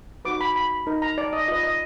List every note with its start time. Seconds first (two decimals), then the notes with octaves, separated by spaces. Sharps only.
0.25 D#4 F#4 B4 D6
0.41 B5
0.56 B5
0.87 D#4 A#4
1.02 A#5
1.18 D5
1.33 D#5
1.48 F4 B4 D#5
1.63 D#5